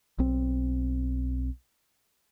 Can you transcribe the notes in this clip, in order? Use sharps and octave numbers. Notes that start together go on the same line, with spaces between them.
B1 C4